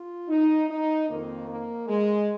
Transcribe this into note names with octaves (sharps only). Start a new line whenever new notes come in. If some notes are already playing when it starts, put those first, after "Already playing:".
Already playing: F4
D#4
D#4
F2 D#3 A#3
A#3
G#3